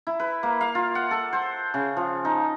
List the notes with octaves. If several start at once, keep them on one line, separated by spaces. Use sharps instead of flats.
E4
B4
A#3
F5
F4
F#5
A4
C5
C#3
F3
D#4